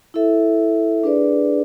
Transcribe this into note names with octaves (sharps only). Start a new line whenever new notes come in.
E4 A4 E5
D4 G#4 B4 D5